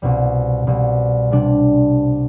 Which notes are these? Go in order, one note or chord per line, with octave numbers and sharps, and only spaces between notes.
C2 B2 G3
C2 B2 G3
C3 G3 D4